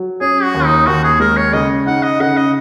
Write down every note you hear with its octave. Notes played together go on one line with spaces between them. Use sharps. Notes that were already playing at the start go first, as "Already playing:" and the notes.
Already playing: F#3
C#4 G#4
F#4
D#2
D#4
D#2 F#4
G#4
G#3 A#4
C#5
C#3 D#5
D#4 F#5
D#5
C#3 F#5
D#5